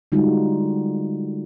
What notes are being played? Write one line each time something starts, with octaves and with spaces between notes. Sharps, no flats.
D3 G3 G#3 D#4 F4 F#4